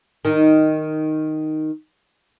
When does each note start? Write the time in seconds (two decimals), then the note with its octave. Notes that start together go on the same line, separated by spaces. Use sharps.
0.25 D#3 D#4